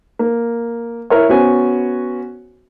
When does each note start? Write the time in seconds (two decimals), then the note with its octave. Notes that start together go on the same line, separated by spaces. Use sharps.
0.19 A#3
1.10 E4 A#4 C#5
1.29 B3 C#4 F#4 C5 G#5